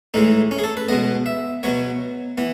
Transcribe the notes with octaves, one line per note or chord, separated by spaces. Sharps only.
A2 E3 G#3 D#4
C#4
G#4
A4
B4
B2 G#3 B3 D#5
E5
B2 F#3 B3 C#5
E3 B3